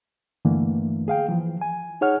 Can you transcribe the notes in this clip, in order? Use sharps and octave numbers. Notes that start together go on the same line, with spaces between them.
G2 D3 E3 A3 A#3
G#4 F5 G5
E3 F3
G#5
D#4 G#4 C#5 F#5 F6